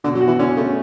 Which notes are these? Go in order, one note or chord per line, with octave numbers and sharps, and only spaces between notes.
B2 D3
F#3
F#4
E3
D3 C#4
C#3 A3